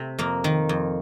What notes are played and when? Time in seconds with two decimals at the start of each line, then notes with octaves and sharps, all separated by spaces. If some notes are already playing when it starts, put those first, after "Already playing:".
Already playing: C3 A3
0.19 F2 A#3
0.44 D#3
0.69 F2